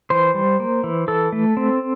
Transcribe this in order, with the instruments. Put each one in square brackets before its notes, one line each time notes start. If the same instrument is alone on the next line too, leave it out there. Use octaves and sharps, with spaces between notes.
[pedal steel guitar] E3 C5
G3
A#3
E3
E3 A4
A3
C4